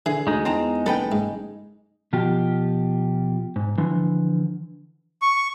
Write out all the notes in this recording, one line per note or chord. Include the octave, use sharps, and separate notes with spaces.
D3 E3 G#4
D2 G#3 D#4
E2 C4 A5 A#5
F#1 F#3 A4 B4 G5
G#2
B2 F3 F4 G4
G#2
D3 E3 F3
C#6